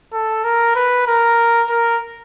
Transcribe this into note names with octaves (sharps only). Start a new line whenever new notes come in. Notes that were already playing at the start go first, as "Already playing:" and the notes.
A4
A#4
B4
A#4
A#4